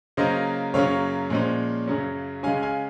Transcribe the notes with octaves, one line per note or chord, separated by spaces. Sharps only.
C#3 F#3 A#3 C#4 C5 D#5
F#2 C#3 F#3 A#3 C#4 C#5 F5
A#2 F3 G#3 C#4
F#2 C#3 F#3 C#4
C#3 G#3 C#4 F5 G#5
F5 G#5